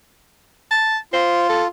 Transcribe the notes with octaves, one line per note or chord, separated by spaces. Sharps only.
A5
F4 C5
A4